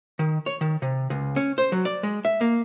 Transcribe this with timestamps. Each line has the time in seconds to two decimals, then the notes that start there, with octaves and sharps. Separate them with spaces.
0.19 D#3
0.46 C#5
0.61 D#3
0.82 C3
1.10 C#2
1.36 C#4
1.58 C5
1.72 F#3
1.85 D5
2.03 G#3
2.25 E5
2.41 A#3